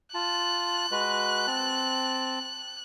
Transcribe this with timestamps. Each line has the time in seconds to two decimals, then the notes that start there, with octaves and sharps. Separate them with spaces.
0.14 F4 A5 F#6
0.92 G#3 F#4 B4
1.47 C4 A5